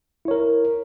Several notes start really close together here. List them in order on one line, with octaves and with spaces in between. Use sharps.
E4 C#5 A#4